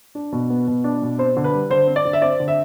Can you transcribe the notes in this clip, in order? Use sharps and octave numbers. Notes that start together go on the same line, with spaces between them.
D4
B2
B3
B2
D4
B2
C4 C5
D3
B4
G3
D3 C5
C4
D5
D3
E5
C4 D5
D3
E5